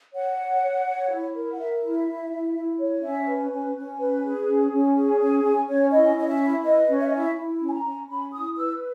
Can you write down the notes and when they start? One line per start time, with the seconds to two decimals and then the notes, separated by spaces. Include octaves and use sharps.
0.14 C#5 F#5
0.38 C#5
0.62 C#5
0.87 C#5
1.10 E4
1.34 A#4
1.51 F#5
1.58 A#4 E5
1.82 E4
2.07 E4
2.31 E4
2.55 E4
2.79 C#5
3.03 C#4 E5
3.27 B4
3.51 C#4
3.76 C#4
3.99 B4
4.24 G#4
4.47 C#4
4.72 C#4
4.95 G#4
5.19 C#4 G#5
5.43 C#4 G#5
5.68 C#4 C#5
5.91 E4 D#5
6.15 C#4 D#5
6.28 E5
6.40 E4
6.64 B4 D#5
6.88 C#4
7.00 E5
7.07 D#5
7.12 E4 E5
7.36 E4
7.60 C#4
7.69 G#5
7.72 A#5
7.85 C#4
8.08 C#4 B5
8.32 E4 D#6
8.56 B4 E6